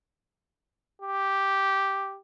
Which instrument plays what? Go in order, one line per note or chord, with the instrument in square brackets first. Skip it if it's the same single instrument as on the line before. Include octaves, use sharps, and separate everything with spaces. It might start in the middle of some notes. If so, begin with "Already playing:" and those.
[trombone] G4